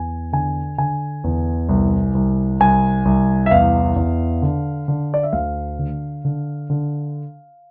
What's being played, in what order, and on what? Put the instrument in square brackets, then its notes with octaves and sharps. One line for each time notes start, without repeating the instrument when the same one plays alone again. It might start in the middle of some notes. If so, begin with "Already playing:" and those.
Already playing: [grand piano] E2 G#5
D3 G#5
D3 G#5
E2
C2
C2
C2 G#5
C2
E5
E2 F5
E2
D3
D3
D5
E5
D2 F5
D3
D3
D3